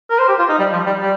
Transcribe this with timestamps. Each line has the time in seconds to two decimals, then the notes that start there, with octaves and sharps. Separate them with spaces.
0.10 A#4
0.19 C5
0.28 G4
0.39 F4
0.49 D#4
0.59 G3
0.72 F3
0.86 G3
1.00 G3